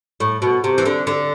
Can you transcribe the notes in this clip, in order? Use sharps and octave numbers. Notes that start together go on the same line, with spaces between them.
A2
B2
C3
E3
D3
D3